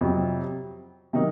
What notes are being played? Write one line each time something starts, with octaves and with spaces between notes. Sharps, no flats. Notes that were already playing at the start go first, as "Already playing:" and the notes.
F2 C3 F#3
C3 D#3 F#3 A#3 D#4